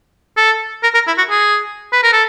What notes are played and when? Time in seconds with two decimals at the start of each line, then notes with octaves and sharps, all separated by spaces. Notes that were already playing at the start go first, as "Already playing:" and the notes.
0.37 A4
0.83 A#4
0.94 A#4
1.07 E4
1.18 F#4
1.30 G#4
1.93 B4
2.03 A#4
2.13 A4